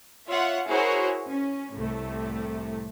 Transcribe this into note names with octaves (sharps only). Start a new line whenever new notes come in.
F4 C#5 E5 F#5
E4 F#4 G#4 A#4 C5 C#5
C#4
C2 A2 C3 A3